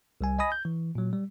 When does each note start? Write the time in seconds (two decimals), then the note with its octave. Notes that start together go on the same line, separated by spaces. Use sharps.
0.21 C2 G3 G#5
0.39 D#5 G#5 B5 D#6 A#6
0.52 G6
0.65 E3
0.95 A#2 F#3
1.13 G3